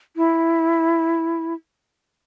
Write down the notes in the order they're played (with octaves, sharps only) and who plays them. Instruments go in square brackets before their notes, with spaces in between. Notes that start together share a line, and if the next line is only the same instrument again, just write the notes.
[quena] E4